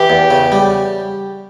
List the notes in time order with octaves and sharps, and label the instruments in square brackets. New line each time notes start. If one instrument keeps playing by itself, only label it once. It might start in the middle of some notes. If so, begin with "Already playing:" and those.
Already playing: [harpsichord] E3 [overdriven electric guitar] G4
[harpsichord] E2
C#3
G3